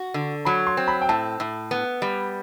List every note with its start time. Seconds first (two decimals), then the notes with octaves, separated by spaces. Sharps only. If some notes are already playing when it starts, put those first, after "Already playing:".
Already playing: F#4
0.14 D3
0.45 F#3 B5
0.67 C6
0.77 C4
0.88 B5
1.02 G5
1.09 A2 A5
1.40 A2
1.71 B3
2.02 G3